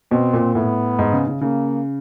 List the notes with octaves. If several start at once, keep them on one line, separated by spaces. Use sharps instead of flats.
B2 C4
A#2
A2 B3
G#2
C#3
C#3
C#3 A#3